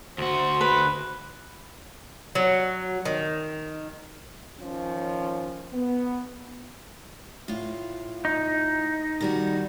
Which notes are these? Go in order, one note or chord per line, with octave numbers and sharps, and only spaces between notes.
D2 F#4 C5
B4
F#3
D#3
D#3 F3 C#4
B3
A2 F4
D#4
D#3 G3 F#4